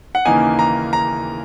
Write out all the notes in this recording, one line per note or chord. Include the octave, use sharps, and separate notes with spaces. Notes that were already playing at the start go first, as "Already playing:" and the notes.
F#5
D#2 C#3 E3 A#3 D#4 G#5
A#5
A#5